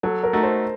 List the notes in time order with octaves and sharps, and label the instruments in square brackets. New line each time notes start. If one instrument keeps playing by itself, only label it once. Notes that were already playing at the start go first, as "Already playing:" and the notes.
[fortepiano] F#3 [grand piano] A4
[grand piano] A#4
[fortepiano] A3 D#4 F#4
[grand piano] C5